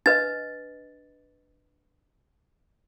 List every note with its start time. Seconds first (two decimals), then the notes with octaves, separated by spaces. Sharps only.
0.06 D4 B4 D#5 A6